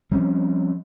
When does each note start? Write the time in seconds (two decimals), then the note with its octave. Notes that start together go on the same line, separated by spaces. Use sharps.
0.11 F3 G3 C4 C#4